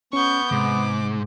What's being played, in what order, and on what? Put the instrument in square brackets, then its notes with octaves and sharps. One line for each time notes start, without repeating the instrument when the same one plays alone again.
[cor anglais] B3 [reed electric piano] C#4 [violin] C#6 G6
[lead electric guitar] G#2 [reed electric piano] C3 [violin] D6